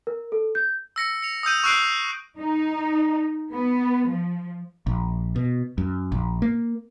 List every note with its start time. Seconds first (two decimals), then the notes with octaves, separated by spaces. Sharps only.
0.07 A#4
0.32 A4
0.55 G6
0.96 E6 A#6 C#7
1.23 C#7 F7
1.43 D#6 E6 G6 D#7
1.64 C#6 E6 F#6 C7 D7 F#7
2.39 D#4
3.54 B3
4.09 F3
4.87 A#1
5.36 B2
5.78 F#2
6.12 A#1
6.42 A#3